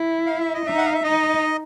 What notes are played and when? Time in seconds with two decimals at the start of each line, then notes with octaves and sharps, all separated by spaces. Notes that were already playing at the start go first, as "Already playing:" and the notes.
Already playing: E4
0.26 F5
0.40 E5
0.54 D#5
0.65 D#4 E5
0.78 F#5
0.85 F5
0.94 E5
1.03 D#4 D#5